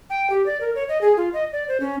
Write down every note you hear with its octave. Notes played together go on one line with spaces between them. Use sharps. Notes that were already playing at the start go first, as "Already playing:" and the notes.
G5
G4
D5
A#4
C#5
D#5
G#4
F4
D#5
D5
C5
C#4